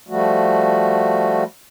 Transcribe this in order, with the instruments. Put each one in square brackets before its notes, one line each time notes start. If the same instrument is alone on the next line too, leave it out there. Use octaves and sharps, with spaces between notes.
[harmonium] F3 G3 A3 F#4